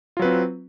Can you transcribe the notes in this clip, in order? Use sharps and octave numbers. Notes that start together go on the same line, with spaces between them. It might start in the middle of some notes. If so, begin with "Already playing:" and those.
F#3 C4 F4 B4